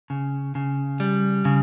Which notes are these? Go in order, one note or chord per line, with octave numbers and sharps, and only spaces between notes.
C#3
C#3
G3
C#3